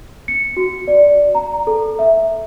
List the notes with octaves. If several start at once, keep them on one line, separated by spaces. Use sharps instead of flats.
C#7
F#4
D5
A#5
A4
E5